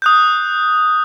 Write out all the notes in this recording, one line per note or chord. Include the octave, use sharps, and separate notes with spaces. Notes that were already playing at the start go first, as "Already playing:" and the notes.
D#6 F#6 G6